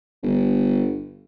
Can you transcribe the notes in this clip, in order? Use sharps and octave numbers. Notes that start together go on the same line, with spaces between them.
G1